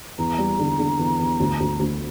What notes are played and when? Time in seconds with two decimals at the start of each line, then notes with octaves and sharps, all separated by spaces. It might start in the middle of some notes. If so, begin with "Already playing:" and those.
0.18 E2 A#5
0.38 G3
0.59 D3
0.79 D3
0.99 E2
1.19 E2
1.40 D2
1.60 D2
1.79 D2